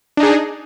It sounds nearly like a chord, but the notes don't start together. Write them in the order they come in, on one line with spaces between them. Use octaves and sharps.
D4 D#4 G#4